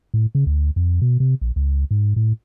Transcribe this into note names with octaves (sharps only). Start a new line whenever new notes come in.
A2
C#3
D2
F2
B2
C3
A#1
C#2
G#2
A2